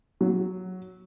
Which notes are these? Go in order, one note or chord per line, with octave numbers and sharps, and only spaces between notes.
F#3